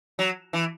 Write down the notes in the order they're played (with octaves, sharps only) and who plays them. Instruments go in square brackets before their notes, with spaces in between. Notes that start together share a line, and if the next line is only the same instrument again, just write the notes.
[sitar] F#3
E3